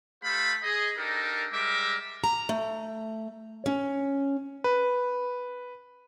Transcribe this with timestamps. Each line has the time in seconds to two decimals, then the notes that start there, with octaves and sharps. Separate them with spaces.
0.23 A3 G4 A4 C5 F5 B5
0.63 G#4 D#5
0.97 D4 D#4 G4 A4 A#4
1.52 G3 G#3 A#4 E5 D6
2.24 A#5
2.49 A3
3.66 C#4
4.64 B4